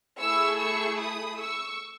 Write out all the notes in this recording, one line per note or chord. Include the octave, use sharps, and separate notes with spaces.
A3 E4 G#4 C#6 E6
C#6 E6
B5 D#6
C#6 E6